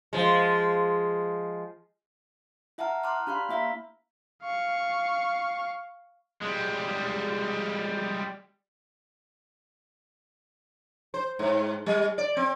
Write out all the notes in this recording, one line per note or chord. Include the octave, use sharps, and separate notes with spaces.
F3 G#3
E4 E5 F#5 A5 A#5 F6
A5 A#5 C6 D6 F6 F#6
D4 G4 F5 B5 C6
A#3 E4 E5 F5 A#5 B6
F5 C#6
G3 G#3
C5
G#2
G3
D5
C4